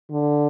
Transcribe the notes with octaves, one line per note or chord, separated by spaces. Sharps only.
D3